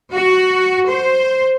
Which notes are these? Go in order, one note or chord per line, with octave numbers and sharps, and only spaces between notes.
F#4
C5